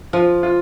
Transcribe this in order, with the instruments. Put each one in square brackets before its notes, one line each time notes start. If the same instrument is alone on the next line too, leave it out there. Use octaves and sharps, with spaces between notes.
[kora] F3 [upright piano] F4
[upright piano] F4